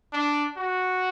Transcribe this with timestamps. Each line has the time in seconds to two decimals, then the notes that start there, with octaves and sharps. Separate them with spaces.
0.13 D4
0.57 F#4